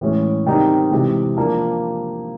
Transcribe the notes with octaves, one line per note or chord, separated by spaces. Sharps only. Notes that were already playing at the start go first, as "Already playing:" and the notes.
A2 E3 G#3 C#4
D#3 G3 C4 D#4
C3 E3 G#3
F3 A#3 D4